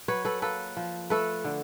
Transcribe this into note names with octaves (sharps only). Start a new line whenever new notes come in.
F#3 B4 C#5
A4 B4
A#3 A4 B4
F3
A3 A4 B4
D3